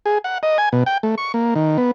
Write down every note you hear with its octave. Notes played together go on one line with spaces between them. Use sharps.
G#4
F#5
D#5
G#5
B2
G5
A3
C#6
A#3
D#3
B3